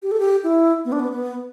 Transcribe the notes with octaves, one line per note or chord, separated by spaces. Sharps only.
G4
A4
G4
E4
B3
D4
B3
B3